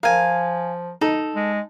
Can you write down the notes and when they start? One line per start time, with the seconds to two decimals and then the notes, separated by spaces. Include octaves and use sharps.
0.03 F3 A#4 F5 G#5
1.01 D#4 A4
1.36 G#3